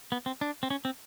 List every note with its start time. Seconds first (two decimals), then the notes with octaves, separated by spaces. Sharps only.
0.12 B3
0.26 C4
0.41 D4
0.63 C4
0.70 C#4
0.85 C4